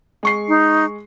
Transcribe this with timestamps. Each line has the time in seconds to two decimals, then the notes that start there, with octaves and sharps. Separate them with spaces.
0.23 G#3 C#6 C7
0.48 D#4